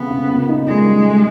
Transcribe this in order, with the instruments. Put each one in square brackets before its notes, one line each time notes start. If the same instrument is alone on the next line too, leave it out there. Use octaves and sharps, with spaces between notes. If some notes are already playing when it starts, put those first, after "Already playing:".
Already playing: [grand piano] C#3 A3 C4 [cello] B3
[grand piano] C#3
A#2
D#4
[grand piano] A#2 [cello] G#3
[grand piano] G3
A3